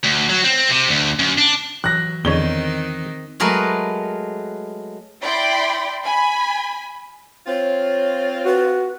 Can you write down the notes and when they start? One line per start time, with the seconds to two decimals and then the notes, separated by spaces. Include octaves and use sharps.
0.04 D2
0.30 F#3
0.44 C4
0.70 C3
0.89 D2
1.19 F#2
1.39 D4
1.84 E3 F#3 F#6 A#6
2.25 E2 D3 D#3 C4 D#4 C#5 G7
3.40 F#3 G#3 A3 A#4 B4
5.21 E4 D5 G5 B5 C6
6.05 G#5 B5
7.47 C4 F4 C#5
8.45 F#4 B4